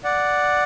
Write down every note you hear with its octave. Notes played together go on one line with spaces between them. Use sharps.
D5 F#5